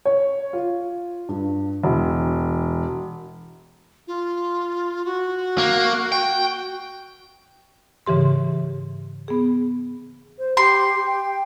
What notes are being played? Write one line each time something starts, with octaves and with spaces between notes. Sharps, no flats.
C#5
F4
G2
E1
F4
F#4
A#3
G5
G#2 C#3 E3 G4 C6
B3 G#4
C5
G4 C6
G5